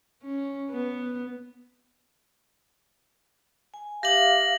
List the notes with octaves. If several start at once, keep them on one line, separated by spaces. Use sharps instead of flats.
C#4
B3
G#5
G4 E5 F5 D6 A#6 F#7